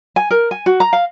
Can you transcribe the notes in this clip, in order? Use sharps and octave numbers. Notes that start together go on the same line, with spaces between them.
G#5
A#4
G#5
F#4
A#5
F5